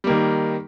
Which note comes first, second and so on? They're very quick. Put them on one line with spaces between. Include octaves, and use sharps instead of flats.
G3 A#3 D#3